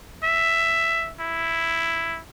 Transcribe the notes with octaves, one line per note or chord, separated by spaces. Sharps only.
E5
E4